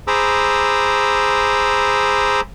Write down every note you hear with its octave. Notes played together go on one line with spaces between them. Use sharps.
G#4 C5 A#5 B5 D6 E6